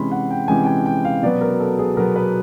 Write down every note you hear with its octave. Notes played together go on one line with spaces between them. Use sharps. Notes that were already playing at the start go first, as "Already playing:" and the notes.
Already playing: C3 E3 G#3 C#4 B5 C6
F#5
G5
C3 E3 G#3 C#4 G#5
G5
G#5
G5
F5
B2 F#3 B3 D5
A#4
A4
G#4
B2 F#3 B3 A#4
B4